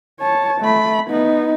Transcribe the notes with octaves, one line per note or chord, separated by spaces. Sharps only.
C#5 A5
A3 B5
B3 D#4